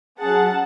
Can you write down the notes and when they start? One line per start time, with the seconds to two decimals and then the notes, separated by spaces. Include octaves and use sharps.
0.20 F#3 C#4 G#4 F#5 A5